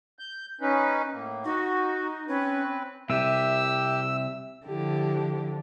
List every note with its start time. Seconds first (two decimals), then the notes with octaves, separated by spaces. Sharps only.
0.19 G6
0.61 C#4 D#4 B4
1.13 A2 A#3
1.45 D#4 F#4
2.28 C4 C#4 B4
3.10 C2 C3 G4 E5 E6
3.86 E5
4.66 D3 F3 E4 G4